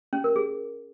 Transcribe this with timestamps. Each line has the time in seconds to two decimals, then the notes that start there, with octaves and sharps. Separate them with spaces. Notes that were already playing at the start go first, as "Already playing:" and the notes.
0.13 C#4
0.24 A#4
0.36 G#4